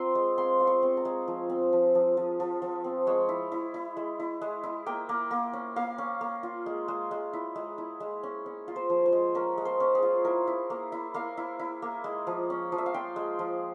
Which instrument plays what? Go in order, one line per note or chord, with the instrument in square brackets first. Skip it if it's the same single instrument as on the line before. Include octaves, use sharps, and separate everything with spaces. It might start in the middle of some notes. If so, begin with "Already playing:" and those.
Already playing: [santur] C4 F4 A#5 C6
G#3
C4 C6
F4
C#6
C4
A#5
G#3
F3
C4
F3
F3
F3
F3
F3
C4
G#3 C#5
E4
E4
E4
G#3
E4
G#3
E4
A#3 G5
A#3
A#3
C#4
A#3 F5
C#4
A#3
F4
G#3
G#3
G#3
E4
G#3
E4
G#3
C#4
C#4
F4
C5
F3
C5
G#3
C#4 A#4
G#3
C5
C#4
G#4
F4
E4 A#4
E4
A#3
E4
A#3 F5
E4
E4
A#3
G#3
F3
C#4
F3
E5
F5
F4 G5
G#3
F3